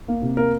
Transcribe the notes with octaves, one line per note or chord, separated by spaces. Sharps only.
A#3
C3
A#3 A#4